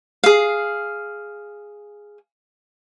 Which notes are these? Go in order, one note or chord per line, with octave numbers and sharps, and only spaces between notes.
G#4 F5